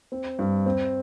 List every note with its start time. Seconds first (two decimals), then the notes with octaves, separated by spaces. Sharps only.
0.12 C4
0.39 G2
0.66 C4